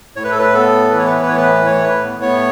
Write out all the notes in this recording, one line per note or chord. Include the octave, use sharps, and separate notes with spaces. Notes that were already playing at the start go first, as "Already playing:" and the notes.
A2 C#5
B4
A4
B4
B3 A4
E3 B4
C#5
B4
C#5
B4
A2 C#5
B4
A2 C#5
B4
B3
C#5